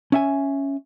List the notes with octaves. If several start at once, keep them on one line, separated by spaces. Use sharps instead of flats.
C#4 E5 G#5